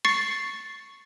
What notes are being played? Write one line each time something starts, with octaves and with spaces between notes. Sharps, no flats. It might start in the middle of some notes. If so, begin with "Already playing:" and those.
C#6 A6 C7 C#7